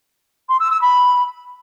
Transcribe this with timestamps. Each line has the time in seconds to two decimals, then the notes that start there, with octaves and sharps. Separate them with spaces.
0.49 C6
0.59 E6
0.70 E6
0.81 B5